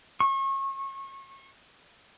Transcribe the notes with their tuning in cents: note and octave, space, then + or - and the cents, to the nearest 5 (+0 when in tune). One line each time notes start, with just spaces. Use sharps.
C#6 -30